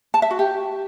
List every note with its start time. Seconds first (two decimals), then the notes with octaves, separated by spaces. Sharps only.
0.14 A5
0.22 E5
0.31 F#4
0.39 G4